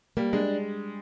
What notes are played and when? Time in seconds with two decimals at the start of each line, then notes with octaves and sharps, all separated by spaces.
0.17 G3 A#3
0.33 G#3 D4